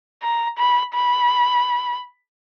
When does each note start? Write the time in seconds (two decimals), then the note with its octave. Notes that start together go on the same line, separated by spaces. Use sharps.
0.23 A#5
0.58 B5
0.94 B5